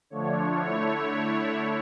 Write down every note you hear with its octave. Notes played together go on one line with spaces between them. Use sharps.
D3 F3 A3 D4 C#5
D3 A3 E4 C#5